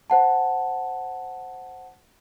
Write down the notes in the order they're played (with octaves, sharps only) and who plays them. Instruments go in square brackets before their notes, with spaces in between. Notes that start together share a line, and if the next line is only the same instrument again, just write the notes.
[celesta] C5 F#5 A5